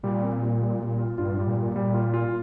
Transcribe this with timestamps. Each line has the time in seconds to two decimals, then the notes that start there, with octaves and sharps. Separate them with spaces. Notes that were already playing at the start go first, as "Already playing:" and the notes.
0.03 A#2 G3
0.23 C4
0.42 G3
0.61 G3
0.81 G3
0.99 F4
1.18 G2 F4
1.37 G3
1.47 A#2
1.56 G3
1.76 G3
1.94 F4
2.14 F4